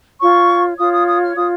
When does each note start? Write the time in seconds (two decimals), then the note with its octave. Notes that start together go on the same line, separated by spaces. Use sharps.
0.20 F4 C#5 C#6
0.78 F4 C#5 D#6
0.93 D#6
1.07 D#6
1.22 F6
1.36 F4 C#5 D#6